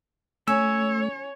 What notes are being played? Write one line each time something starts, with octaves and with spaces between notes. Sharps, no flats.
A3 C#4 C#5 E6